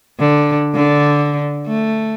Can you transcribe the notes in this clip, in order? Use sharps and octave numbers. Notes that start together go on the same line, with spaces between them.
D3
D3
A3